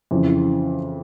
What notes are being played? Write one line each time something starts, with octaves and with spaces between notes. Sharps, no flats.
F2 C#3 E3